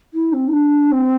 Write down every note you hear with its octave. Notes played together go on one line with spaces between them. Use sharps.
E4
C4
E4
D4
C4